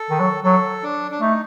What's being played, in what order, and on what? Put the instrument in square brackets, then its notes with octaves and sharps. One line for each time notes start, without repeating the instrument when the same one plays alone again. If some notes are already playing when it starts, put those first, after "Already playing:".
Already playing: [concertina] A4
[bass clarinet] D#3
F#3
[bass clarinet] F#3 [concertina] A4
[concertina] D4
D4
[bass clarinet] A3 [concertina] D#4